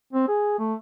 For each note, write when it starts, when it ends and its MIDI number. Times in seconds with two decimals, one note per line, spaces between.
0.13 0.28 60
0.28 0.58 68
0.59 0.74 57